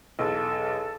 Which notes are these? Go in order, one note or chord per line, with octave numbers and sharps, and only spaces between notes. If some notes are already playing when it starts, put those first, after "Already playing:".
B1 E2 A4